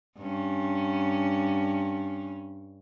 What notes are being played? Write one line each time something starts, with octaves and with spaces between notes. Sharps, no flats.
G2 C#4